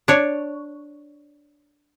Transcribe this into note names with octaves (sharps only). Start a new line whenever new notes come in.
D4 C#5